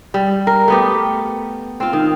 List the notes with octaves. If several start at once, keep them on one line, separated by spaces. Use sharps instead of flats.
G3
A#4
A3 B3 G4
C4 F4
D#3